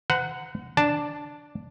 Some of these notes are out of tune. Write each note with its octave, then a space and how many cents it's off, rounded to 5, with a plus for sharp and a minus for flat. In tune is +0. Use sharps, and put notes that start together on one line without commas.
C5 -45 F#5 +0 A#5 +0
D4 +0 A5 +0